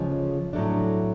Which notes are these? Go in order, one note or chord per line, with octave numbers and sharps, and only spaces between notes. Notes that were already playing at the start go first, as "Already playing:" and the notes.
Already playing: D2 C#3 F3 G#3 C#4
A2 F#3 A3 D4